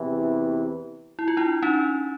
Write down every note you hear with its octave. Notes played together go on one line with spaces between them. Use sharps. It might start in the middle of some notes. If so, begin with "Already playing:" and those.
Already playing: E2 C3 E3
E4
F4
D4 E4
C#4 D#4